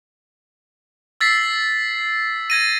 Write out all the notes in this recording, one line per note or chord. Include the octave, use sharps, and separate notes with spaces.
E6 A6 B6 C7
G#6 A#6 D#7